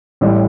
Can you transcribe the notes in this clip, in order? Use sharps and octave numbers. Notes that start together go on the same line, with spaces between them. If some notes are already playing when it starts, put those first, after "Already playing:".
A1 A2 G3